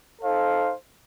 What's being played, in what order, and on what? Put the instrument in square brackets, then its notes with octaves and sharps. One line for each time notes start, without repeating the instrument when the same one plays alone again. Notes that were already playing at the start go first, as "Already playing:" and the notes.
[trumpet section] D#4 A4 C5 F5